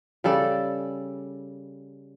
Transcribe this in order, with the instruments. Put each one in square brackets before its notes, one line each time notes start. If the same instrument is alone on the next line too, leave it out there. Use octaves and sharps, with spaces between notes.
[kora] C#3 G3 A4 D5